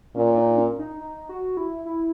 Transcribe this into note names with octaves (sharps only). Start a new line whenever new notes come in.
A#2 C#4
D#4
C#4
D#4
D#4
F#4
E4
E4